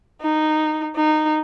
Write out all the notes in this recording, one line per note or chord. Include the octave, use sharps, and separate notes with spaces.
D#4
D#4